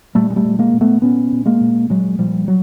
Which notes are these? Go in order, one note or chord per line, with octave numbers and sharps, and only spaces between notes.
A#2 G3 A3
G#3
G3 A3
A#2
G#3 A#3
A#2
A3 B3
A#2 B3 C#4
A#2
G#3 A#3
A#2
A#2 F#3 G#3
A#2 F3 G3
F#3